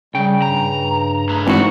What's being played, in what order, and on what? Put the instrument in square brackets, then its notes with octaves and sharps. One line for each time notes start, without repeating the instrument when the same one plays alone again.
[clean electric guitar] C#3 G5 [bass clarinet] G3
[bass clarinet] G2 [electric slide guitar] A#5
[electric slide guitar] A3 G#4 B4
[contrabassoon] G#1 [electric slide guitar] F2 A2 D#3 [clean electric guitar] E3 F#4